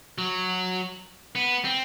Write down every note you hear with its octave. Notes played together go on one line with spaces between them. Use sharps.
F#3
B3
C4